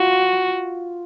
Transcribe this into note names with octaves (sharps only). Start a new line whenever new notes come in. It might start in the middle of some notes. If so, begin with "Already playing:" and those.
Already playing: F4 F#4